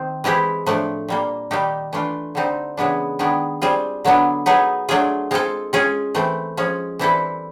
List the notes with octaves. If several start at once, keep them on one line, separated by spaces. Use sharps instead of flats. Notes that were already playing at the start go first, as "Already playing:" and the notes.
Already playing: D#3 C4
E3 G#3 C4 E4 G4
A2 F3 A3 D4
A#2 G3 A#3
D#3 G3 A#3 D#4 G4
E3 A3 D4 F4
D3 G3 C4 D#4
C#3 E3 G#3 B3 D4
D#3 G#3 B3 D4
G3 C4 F4 G#4
D3 F#3 B3 D4
F#3 B3 D#4 G#4
F#3 A3 D4 F4 G#4
G#3 C4 F4 A4
G#3 C#4 F4 G#4
E3 A3 C4
F3 G#3 C#4
E3 G3 C4 E4 A4